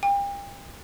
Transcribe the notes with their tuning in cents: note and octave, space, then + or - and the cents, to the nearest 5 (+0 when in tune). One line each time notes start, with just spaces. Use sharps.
G5 +40